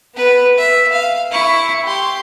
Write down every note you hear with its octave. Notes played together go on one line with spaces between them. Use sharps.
B3 B4
E5
F5
E4 C#6
G4 C6